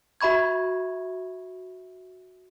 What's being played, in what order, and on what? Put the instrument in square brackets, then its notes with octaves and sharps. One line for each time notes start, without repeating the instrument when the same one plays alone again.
[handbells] F#4 E5 B5 C#6 G#6